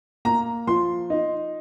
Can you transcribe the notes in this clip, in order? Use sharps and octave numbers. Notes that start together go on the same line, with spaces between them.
A#3 A#5
F3 C6
D#4